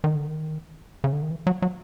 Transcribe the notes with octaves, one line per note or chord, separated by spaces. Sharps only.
D#3
D3
D#3
C#3
D3
D#3
E3
F#3
F#3